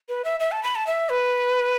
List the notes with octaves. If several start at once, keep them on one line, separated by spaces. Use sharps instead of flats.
B4
E5
E5
A5
B5
A5
E5
B4